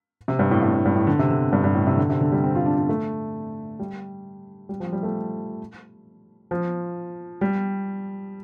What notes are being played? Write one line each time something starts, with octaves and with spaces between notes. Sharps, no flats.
C3
G2
A2
A2
A2
G2
A2
D3
C3
D3
G2
G2
A2
C3
D3
C3
D3
G3
C4
F4
D4
D4
A3
G3
G3
F3
G3
A3
F3
G3